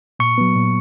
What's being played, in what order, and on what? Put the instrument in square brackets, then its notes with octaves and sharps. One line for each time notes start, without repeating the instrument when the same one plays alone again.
[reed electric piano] A#2 [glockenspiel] C#6 C#7
[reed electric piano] F#3 B3
A#2